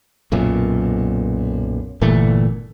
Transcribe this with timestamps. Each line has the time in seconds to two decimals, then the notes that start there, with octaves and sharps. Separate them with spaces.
0.32 B1 F#2 A#2
2.01 G1 A#2 E3 A3